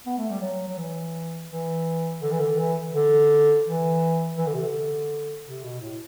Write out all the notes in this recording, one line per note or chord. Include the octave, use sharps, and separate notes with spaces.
B3
A3
G3
F#3
F#3
E3
E3
D3
E3
D3
E3
D3
E3
E3
D3
C3
D3
C3
B2
A2